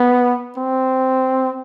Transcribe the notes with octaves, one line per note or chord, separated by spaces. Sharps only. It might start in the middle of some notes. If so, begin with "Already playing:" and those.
Already playing: B3
C4